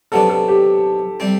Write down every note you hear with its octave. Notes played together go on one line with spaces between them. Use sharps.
C3 F#3 B3 D4 A4
A4
G4
C3 G3 C4